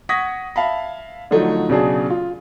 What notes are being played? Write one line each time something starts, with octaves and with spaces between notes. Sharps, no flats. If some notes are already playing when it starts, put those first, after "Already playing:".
F#5 C#6 D#6 G#6 A#6 B6
E5 F5 A5 B5
D3 F3 F#3 A3 D4 D#4
B1 C#3 F#3 D4 G#4 A5
F4